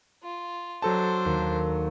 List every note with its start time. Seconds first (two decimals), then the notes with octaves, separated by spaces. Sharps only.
0.23 F4
0.82 F#3 D4 A4 C5 A5
1.25 D#2